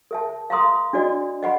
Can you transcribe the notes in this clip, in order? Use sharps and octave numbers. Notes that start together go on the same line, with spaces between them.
A#4 E5 A5
F5 A#5 C6 D#6
D4 F#4 D5 D#5
D#5 F#5 B5